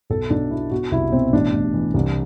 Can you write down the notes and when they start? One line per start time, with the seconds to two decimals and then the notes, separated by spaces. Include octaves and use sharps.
0.10 B1 A4
0.30 B1 D4
0.50 B2 E4
0.71 B2 F#4
0.91 C2 E4
1.12 B2 C4
1.33 A1 D4
1.53 A1
1.74 E3
1.94 C2